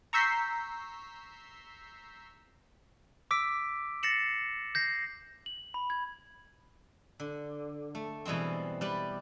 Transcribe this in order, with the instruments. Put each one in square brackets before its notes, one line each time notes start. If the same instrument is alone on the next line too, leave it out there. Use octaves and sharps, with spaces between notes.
[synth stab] A#5 C#6 E6 G6 B6 C7
[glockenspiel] D6 E6 B6 D7
A6 A#6 C7 C#7 E7 F#7
G6 A#6 C7
F#7
B5
G#6
[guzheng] D3
A3
B2 E3 G3 G#3 C4
G3 B4 D5